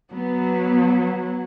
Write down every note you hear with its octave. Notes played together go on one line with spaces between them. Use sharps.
F#3 B3